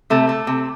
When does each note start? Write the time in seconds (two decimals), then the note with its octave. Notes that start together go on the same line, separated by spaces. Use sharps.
0.10 C3 A3
0.29 A3
0.47 C3